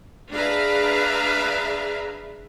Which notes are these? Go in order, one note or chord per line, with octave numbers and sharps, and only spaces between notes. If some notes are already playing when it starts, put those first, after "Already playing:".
D4 G#4 B4 E5 F5 A#5